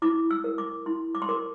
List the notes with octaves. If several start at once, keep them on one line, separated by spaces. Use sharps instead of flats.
E4 D6
E6
A#4
D6
E4 C6
D6
C6
A#4 D6